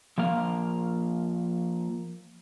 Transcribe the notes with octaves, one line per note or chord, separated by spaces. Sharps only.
F3 A#3 F5